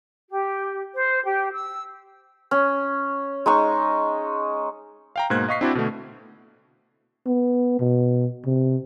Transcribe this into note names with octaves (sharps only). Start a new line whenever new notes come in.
G4
C5
G4
E6
C#4
G#3 D#4 C#6
F5 G5 A#5
G#2 B2 A#3 C5 F#6 G#6
D#5 F5 C#6 B6 C7
C4 D4 E4 F#4 C5 D5
B2 D3 A3
B3
B2
C3